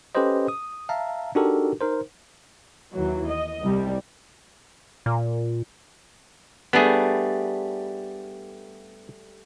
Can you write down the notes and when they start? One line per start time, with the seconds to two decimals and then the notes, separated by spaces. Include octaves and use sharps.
0.15 C#4 G4 A4 B4 C5 D#5
0.48 D#6
0.89 E5 F5 A5 A#5
1.35 D4 D#4 F#4 G4 A4 A#4
1.81 D#4 A#4 C5
2.94 D#2 E3 F#3
3.30 D#5
3.61 C2 G3
5.06 A#2
6.73 G3 A3 B3 D4 G#4